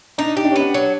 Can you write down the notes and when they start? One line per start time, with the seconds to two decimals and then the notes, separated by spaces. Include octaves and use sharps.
0.18 D4 D#4
0.37 D#4 G4
0.45 D4
0.52 C#4
0.56 B3 D4
0.74 F#3